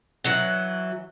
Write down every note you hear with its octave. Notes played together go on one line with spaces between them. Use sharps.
E3 F#3 F#5